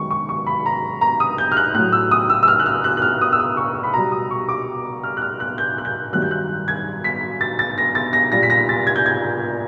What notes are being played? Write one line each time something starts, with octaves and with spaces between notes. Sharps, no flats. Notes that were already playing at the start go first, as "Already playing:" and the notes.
Already playing: F#2 D#3 G#3 C#6
C#6
C#6
B5
A#5
A#5
D#6
G6
F6
F#6
A2 F#3 F#6
E6
D#6
E6
E6
F6
F#6
F6
F#6
F#6
F6
D#6
E6
D#6
C#6
B5
B2 G3 A#5
D#6
C#6
D6
F6
F#6
F6
F#6
G6
F#6
G6
G2 D#3 F#3 F#6
G6
F#6
G#6
B6
A6
A6
A#6
A6
A#6
A#2 G3 A#6
B6
A#6
A6
G#6
G6
G#6